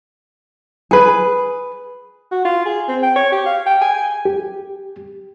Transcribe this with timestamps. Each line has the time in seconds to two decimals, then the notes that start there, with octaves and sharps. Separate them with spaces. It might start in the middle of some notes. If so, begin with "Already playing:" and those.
0.91 G#4 B4
2.32 F#4
2.45 F4
2.66 G#4
2.88 C4
3.03 G5
3.16 C#5
3.32 G4
3.46 F5
3.66 G5
3.82 G#5
3.94 G#5
4.25 G4